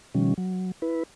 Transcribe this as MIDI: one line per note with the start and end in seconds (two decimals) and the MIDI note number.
0.15 0.34 47
0.15 0.34 51
0.15 0.34 53
0.15 0.34 55
0.15 0.34 61
0.38 0.71 54
0.82 1.03 64
0.82 1.03 71